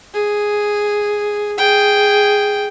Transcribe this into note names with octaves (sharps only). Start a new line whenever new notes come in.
G#4
G#4 G5